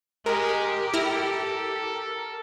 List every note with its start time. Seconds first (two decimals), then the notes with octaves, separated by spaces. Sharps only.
0.26 G#3 G4 A#4
0.94 E4 A4 F6 A#6